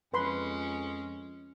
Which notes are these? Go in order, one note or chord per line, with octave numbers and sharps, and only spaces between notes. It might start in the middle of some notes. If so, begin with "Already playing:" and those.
F2 G#3 C#4 B4 B5 C6